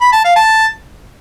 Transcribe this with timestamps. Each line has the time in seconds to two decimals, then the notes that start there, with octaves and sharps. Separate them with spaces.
0.01 B5
0.13 A5
0.24 F5
0.36 A5